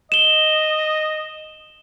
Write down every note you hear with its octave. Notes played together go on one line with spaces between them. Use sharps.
D#5 E7 G7